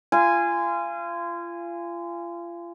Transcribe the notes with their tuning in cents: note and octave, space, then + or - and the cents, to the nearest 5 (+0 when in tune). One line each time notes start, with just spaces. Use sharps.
F4 -30 G#5 -10